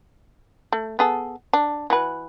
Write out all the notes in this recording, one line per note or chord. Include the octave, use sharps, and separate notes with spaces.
A3
B3 G#4 A4
D4
E3 F#4 B4